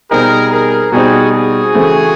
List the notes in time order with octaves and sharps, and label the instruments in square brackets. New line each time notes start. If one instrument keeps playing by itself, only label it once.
[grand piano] B2 G3 C4 D#4 [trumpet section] G#4 A#4
[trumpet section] G#4 A#4
[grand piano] B2 G3 C4 D#4 [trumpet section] F#4 G#4
[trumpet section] F#4 G#4
[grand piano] C#3 E3 A3 C4